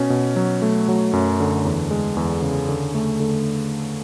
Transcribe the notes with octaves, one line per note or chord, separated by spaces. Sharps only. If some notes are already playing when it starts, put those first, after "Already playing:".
Already playing: B2 C#4
B2
F#3
A3
F#3
F#2
D3
E2
G#3
E2
C#3
D3
A3
D3